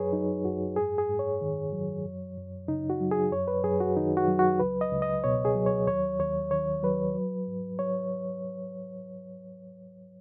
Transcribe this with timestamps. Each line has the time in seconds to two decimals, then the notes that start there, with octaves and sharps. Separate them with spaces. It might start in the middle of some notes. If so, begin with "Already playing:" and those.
Already playing: F#2 F#3 G#4 B4 C#5
0.13 F#3 D#4
0.45 F#2 F#4
0.76 G#2 G#4
0.98 G#4
1.09 G#2
1.19 C#5
1.41 D#3
1.73 F#3
2.05 F#2
2.37 F#2
2.68 C#3 D#4
2.90 F#4
3.01 F#3
3.12 G#4
3.32 F#2 C#5
3.48 B4
3.64 F#2 G#4
3.80 F#4
3.96 D#3 D#4
4.17 F#4
4.28 F#3
4.39 F#4
4.60 C#2 B4
4.81 D#5
4.92 C#2
5.02 D#5
5.24 B2 C#5
5.45 G#4
5.55 F#3
5.66 C#5
5.87 D#2 C#5
6.20 D#2 C#5
6.51 D#3 C#5
6.83 F#3 B4
7.15 F#3
7.47 G#2
7.79 F#3 C#5